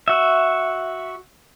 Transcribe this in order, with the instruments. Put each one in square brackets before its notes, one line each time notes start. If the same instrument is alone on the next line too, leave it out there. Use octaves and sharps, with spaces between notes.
[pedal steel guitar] F#4 E5